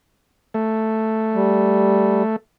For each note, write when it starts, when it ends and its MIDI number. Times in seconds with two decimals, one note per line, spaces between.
0.54 2.36 57
1.35 2.23 55